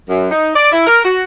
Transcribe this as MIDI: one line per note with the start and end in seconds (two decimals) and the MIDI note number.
0.09 0.28 42
0.31 0.51 63
0.56 0.71 74
0.72 0.84 64
0.87 1.03 70
1.05 1.23 66